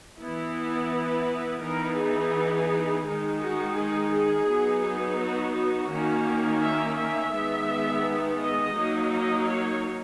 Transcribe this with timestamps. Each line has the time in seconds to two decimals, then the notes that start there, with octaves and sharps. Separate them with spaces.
0.19 E3 B3 E4
0.90 B4
1.62 E3 B3 D#4 A#4
1.97 G#4
3.04 D#3 G#3 D#4
3.40 F#4
3.76 G#4
4.12 G#4
4.47 F#3 B3 D#4
4.83 G#4
5.19 F#4
5.55 F#4
5.90 D#3 A#3 C#4
6.61 E5
6.97 E5
7.33 D#3 G#3 B3
8.40 D#5
8.75 F#3 A#3 D#4
9.11 D#5
9.47 C#5